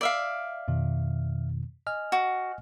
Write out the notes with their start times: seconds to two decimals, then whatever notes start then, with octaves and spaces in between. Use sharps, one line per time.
0.01 D5 E5 F5
0.68 F2 B2 D#3
1.87 D#5 G#5 F6
2.12 F#4